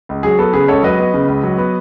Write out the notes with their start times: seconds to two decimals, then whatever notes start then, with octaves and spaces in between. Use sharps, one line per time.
0.09 C#2
0.23 F#3 G#4
0.39 B3 A4
0.53 C#3 G#4 B4
0.68 C#2 A4 C#5
0.83 F#3 B4 D#5
0.98 B3
1.13 C#3
1.28 C#2
1.43 F#3
1.58 B3